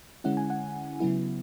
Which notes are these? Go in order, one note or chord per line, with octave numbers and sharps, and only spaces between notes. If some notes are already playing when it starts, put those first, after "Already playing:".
D3 G#3 C#4 E4 F#5
G#5
F#5
C#3 F#3 B3 E4